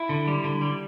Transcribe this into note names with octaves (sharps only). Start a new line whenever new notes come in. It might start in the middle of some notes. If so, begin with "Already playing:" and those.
Already playing: E4
D3
G3
D3
G3